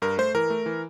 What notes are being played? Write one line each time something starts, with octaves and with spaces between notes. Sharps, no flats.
G2 A#4
A3 C5
E3 A#4
A3
E3